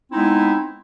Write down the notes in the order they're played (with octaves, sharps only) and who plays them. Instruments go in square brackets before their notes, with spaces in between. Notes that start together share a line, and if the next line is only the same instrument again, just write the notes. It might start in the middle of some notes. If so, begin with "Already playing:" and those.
[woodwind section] G#3 B3 C4 D#4 E4